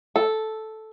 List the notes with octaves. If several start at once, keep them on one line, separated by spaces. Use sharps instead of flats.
A4